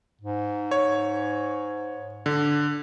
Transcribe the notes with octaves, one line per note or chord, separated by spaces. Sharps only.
G#2
C#5
D3